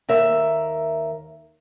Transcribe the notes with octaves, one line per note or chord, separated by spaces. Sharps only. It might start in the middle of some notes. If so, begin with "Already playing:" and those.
D#2 A#4 E5